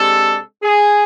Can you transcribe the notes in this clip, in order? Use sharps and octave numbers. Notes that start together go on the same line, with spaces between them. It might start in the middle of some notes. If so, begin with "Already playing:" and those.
Already playing: C3 G#3 D4 A4
G#4